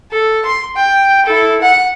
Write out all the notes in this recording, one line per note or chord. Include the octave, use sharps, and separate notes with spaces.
A4
C6
G5
E4 A4
F#5